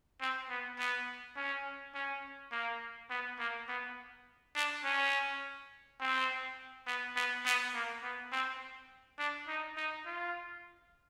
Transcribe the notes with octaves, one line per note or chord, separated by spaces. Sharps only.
C4
B3
B3
C#4
C#4
A#3
B3
A#3
B3
D4
C#4
C4
B3
B3
B3
A#3
B3
C4
D4
D#4
D#4
F4